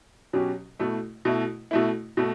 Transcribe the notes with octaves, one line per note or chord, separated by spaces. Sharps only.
B2 F#3 C#4 G4
B2 A3 E4
B2 A3 E4
B2 A3 E4
B2 A3